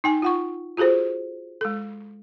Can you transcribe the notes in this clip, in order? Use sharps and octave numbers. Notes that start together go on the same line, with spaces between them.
D#4 G5 G#5
F4 F#5 C#6
F4 F#4 G#4 A4 C5
G#3 A4